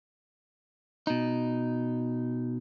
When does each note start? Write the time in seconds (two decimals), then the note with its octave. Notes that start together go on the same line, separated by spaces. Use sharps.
1.07 B2 D#4